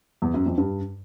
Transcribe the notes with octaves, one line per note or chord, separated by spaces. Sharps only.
E2
F#2
F2
G2